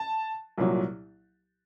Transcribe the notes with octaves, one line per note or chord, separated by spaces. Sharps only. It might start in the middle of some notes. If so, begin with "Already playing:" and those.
Already playing: A5
C2 A#2 F#3